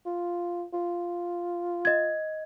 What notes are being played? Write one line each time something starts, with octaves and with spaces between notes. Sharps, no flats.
F4
F4
D#5 G#6